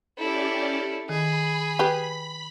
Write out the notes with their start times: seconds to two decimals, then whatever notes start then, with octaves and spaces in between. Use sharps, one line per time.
0.18 C#4 E4 G4 A4 D5
1.09 D#3 G#4 B5 B6
1.79 G4 B4